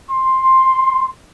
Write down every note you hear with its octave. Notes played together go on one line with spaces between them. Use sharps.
C6